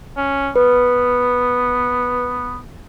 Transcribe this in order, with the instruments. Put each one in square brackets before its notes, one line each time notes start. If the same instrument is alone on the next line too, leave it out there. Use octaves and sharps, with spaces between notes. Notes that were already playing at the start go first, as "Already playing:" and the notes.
[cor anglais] C#4
[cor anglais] B3 [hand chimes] B4